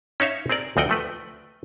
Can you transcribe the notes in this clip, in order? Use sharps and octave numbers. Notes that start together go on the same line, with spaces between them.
C#4 D#4 C#5 E5 F5
C4 G#4 A#4 D5
D2 F3 C4 D#5 F#5 G5
F3 A3 B4